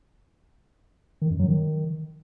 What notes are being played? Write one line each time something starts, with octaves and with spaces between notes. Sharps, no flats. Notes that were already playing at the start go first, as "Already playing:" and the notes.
D#3
F#2
F#3
D#3